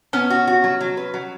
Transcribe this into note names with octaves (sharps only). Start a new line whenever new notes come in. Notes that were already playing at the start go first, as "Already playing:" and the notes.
B3 C#4
F#4
F#4
F#3
F#3
B4
F#3